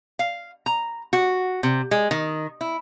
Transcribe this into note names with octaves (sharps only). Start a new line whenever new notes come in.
F5
A#5
F#4
C3
G#3
D#3
E4